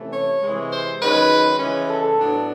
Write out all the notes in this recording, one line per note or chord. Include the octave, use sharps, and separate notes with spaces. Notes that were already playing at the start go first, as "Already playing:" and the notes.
Already playing: C3 E3 A3 C#4
C#5
C3 E3 G#3
C5
F#2 D#3 G#3 C#4 B4
C#3 E3 G#3 C#4
A4
A2 F#3 B3 D4